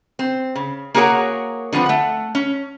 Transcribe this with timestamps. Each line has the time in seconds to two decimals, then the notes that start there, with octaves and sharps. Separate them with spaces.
0.19 C4
0.56 C#3
0.94 A#3 F#4 G#4 A#4 C#5 F#5
1.73 D3 F3 B3 C4
1.86 A3 F#5
2.35 C#4